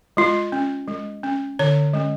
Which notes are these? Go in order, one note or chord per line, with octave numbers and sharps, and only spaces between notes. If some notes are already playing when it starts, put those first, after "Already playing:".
G#3 F4
C#4
G#3
C#4
D3 C#5
G#3 C#4